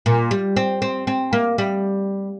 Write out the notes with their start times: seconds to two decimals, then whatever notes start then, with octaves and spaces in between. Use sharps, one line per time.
0.06 A#2
0.31 G3
0.56 C4
0.82 C4
1.07 C4
1.33 A#3
1.58 G3